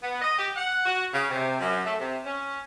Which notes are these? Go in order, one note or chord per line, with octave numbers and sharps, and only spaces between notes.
B3
D#5
G4
F#5
F#4
C#3
C3
F#2
A3
C3
C#4